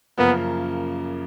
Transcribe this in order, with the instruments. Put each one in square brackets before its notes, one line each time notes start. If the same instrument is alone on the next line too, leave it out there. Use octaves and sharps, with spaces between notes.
[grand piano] F#2 C#3 F3 A#3 [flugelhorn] B3